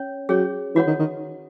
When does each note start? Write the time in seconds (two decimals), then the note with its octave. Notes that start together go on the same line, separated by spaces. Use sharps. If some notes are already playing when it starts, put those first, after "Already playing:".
Already playing: C#4 C#5
0.29 F#3 C#4 G#4 C#5
0.75 E3 F#4 C#5 F#5
0.87 D#3
0.99 D#3